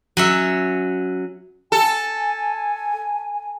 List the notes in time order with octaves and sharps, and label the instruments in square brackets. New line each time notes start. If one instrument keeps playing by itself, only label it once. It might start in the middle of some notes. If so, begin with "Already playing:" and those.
[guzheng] F#3 C#4 E5
[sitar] A4 [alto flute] G#5